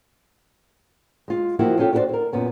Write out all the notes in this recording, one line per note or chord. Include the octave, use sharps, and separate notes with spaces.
G#3 F4
E2 F3 A#3 E4 F#4 G4
C#4 F4 G4 A4 E5
D4 F#4 G4 B4 C5 D5
E4 A#4
F#2 A#2 B3 C#4